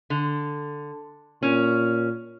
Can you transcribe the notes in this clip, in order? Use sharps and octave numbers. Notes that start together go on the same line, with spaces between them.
D3
A#2 C#4